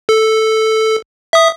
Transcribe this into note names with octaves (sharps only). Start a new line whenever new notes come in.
A4
E5 D#6